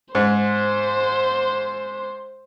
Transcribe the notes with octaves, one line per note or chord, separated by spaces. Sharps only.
G#2 C5